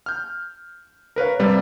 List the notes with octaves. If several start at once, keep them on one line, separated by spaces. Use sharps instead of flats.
F6 G6
A#4 B4 C#5 F5
C3 G3 B4